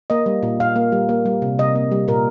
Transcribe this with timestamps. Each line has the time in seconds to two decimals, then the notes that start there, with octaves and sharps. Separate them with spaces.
0.10 A#3 D#5
0.26 G3
0.43 A#2
0.60 A#2 F5
0.76 A#3
0.92 G3
1.09 A#3
1.26 G3
1.42 C3
1.59 C3 D#5
1.75 A#3
1.92 G3
2.08 A#2 A#4